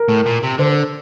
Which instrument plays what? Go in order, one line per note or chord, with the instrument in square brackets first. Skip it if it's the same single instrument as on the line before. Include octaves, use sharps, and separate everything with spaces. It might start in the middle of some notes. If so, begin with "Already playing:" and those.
Already playing: [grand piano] A#4
[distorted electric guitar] A2
A#2
C3
[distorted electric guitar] D3 [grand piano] C5